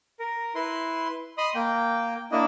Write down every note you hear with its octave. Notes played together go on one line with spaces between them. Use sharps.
A#4
E4 B4 C6
D#5 B5 C6 D#6
A#3 G5
A#3 D4 E4 D#5